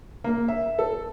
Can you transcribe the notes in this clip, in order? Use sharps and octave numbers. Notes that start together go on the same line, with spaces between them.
A#3
E5
A4